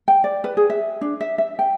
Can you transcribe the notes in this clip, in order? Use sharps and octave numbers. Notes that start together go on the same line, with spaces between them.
G5
D5
B4
G#4
E5
D4
E5
E5
G5